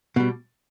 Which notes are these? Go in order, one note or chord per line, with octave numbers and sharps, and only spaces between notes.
B2 G3